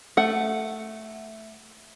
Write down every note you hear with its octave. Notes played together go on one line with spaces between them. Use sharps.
A3 F#5